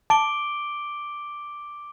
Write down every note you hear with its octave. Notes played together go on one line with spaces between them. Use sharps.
A5 D6 D7 G7